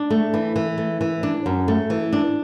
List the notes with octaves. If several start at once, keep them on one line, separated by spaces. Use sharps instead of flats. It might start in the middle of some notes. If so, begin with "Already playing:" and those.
Already playing: D4
A3
E3
E3
A3
E3
D4
F#2
A3
E3
D4